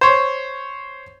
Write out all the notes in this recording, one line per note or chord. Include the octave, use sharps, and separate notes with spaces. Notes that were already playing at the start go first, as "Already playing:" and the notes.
C5 C#5